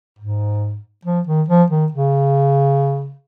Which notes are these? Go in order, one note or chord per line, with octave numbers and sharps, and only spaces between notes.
G#2
F3
D#3
F3
D#3
C#3